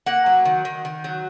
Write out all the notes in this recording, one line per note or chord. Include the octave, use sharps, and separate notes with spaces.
A#3 F#5
F#3
D#3
D#3
D#3
F#3